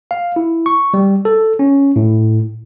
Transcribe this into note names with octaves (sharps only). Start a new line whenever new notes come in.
F5
E4
C#6
G3
A4
C#4
A2